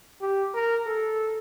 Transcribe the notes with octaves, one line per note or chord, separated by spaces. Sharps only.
G4
A#4
A4